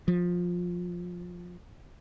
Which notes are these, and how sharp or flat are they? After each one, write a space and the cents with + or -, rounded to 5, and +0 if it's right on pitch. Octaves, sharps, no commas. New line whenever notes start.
F3 +15